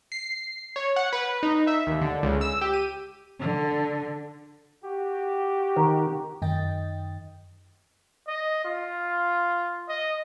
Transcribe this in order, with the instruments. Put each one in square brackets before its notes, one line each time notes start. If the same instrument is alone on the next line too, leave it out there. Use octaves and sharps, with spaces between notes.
[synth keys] C7
C#5
F#5
B4
D#4
E5
D#2
D3
C#2
E6
G4
D#7
[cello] D3
[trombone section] F#4 G4
[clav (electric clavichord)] D#3
[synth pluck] F#2 D#3 D#5 G5 A6
[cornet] D#5
F4
D#5